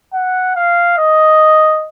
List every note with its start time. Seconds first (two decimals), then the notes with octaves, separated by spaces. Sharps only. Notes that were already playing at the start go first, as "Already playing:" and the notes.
0.13 F#5
0.56 F5
0.98 D#5